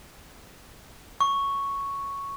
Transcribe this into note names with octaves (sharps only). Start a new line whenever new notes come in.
C#6